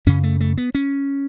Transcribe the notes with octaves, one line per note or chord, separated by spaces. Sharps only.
F#2 C#3 C#4
A3
A3
B3
C#4